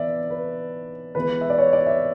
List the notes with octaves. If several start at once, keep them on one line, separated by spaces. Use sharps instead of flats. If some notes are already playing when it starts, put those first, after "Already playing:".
Already playing: E3 B3 D5 E5
B4
E3 G#3 B3 B4
E5
D5
C#5
D5
E5